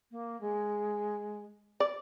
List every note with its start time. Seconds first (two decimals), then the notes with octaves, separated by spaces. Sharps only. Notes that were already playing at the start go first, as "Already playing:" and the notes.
0.11 A#3
0.41 G#3
1.80 D5